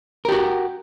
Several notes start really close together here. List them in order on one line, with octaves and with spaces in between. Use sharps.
A#4 G4 F#4